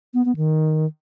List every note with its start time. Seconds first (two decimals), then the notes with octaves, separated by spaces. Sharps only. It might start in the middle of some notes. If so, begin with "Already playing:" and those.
0.14 B3
0.25 B3
0.37 D#3